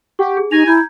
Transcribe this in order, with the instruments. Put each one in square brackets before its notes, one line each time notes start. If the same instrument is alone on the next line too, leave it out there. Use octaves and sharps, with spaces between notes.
[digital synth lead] G4 [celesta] F#5 C#6
[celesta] G#4
[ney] D#4 [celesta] G4 A#6 F7 [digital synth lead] G#5
[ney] E4 [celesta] A#5 G6 G#6